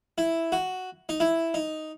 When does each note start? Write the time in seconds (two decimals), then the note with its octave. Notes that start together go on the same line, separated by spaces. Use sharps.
0.18 E4
0.52 F#4
1.09 D#4
1.20 E4
1.54 D#4